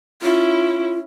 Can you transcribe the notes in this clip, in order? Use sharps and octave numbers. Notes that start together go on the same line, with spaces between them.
C#4 E4 F4